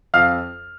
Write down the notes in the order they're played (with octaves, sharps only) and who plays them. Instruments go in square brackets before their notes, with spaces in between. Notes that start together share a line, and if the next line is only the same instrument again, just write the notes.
[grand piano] F2 F5 F6